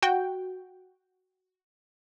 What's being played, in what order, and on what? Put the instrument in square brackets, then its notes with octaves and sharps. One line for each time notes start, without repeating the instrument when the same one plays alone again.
[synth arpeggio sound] F#4 G5